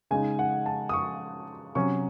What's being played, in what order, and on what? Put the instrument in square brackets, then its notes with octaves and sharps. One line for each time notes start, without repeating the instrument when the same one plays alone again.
[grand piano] C#3 G#3 D#4 G#5
F#5
A5
D#6
C#6
C3 F#3 C#4 C#6